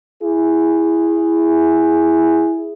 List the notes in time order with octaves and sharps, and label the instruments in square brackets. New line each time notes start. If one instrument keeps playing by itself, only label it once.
[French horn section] E4 G#4